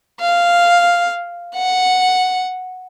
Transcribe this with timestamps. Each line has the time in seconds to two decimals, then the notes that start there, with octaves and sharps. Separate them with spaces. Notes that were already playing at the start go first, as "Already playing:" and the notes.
0.20 F5
1.55 F#5